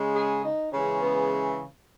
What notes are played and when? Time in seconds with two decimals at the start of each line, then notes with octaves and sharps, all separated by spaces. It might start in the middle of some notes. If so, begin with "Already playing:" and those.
Already playing: C#3 G#3
0.15 G#4
0.44 D#4
0.72 C#3 E3 G#3 C#4
1.01 B3